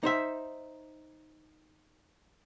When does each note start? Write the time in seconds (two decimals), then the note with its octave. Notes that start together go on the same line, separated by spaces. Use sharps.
0.03 D#4 C5 E5